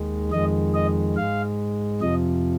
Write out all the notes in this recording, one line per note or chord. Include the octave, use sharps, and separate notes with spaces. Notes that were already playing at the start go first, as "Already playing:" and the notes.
Already playing: D#2 D#3 G#3
F2 D#3 G#3 D#5
D#5
G#2 G#3 F5
F2 C3 F3 D#5